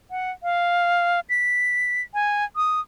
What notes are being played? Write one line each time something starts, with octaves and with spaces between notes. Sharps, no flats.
F#5
F5
B6
G#5
D#6